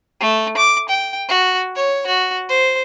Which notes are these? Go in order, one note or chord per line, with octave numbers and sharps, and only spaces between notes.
A3
D6
G5
F#4
C#5
F#4
C5